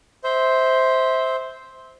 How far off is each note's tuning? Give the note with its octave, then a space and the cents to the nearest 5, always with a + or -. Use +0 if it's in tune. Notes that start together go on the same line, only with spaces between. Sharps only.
C5 +0 E5 -25